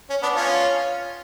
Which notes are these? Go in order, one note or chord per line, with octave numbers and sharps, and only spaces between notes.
C#4
B3 D4
C#4 F4